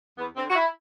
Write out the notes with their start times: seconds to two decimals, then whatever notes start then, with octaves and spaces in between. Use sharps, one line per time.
0.18 E2 B3
0.37 D3 C4
0.50 F#4
0.56 E4